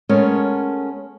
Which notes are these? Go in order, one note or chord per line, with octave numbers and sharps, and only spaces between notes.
G#3 A3 B3 C#4 A#4